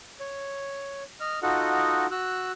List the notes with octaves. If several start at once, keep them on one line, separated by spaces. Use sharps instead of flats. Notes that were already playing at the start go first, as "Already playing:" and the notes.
C#5
D#5 F6
D#4 F4 F#4 A4 D#5 F#5
F#4 E6 F#6